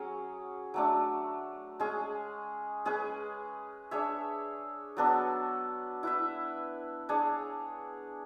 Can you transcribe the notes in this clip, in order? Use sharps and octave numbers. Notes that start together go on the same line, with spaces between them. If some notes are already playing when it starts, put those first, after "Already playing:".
Already playing: F#3 C#4 G#4 C#5
F#3 A3 D4
G#3 C#4 G#4
G#3 C#4 G#4 B4
D4 G#4 C#5 E5
F#3 B3 D4 A4
E4 B4 E5
D4 G#4 C#5